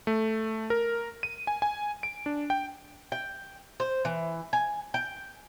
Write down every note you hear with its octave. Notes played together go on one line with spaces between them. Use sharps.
A3
A#4
D#7
G#5
G#5
D7
D4
G5
G5
C5
E3
G#5
G5